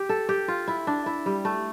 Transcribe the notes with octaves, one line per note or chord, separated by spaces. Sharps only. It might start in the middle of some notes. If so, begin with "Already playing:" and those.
Already playing: G4
A4
G4
F4
E4
D4
E4
G3
A3